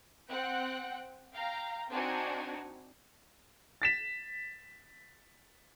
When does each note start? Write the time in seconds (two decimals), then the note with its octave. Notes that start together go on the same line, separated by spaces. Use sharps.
0.29 C4 F#5 G5 F#6
1.33 F5 G5 A#5
1.91 C4 D4 D#4 F#4 G#5
3.82 A6 B6 E7